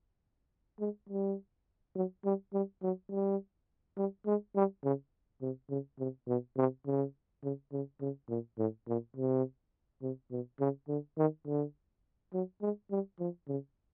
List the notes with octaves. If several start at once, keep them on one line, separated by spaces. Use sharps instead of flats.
G#3
G3
F#3
G3
G3
F#3
G3
G3
G#3
G3
C#3
C3
C#3
C3
B2
C3
C#3
C#3
C#3
C#3
A#2
A2
A#2
C3
C3
B2
C#3
D3
D#3
D3
F#3
G#3
G3
F3
C#3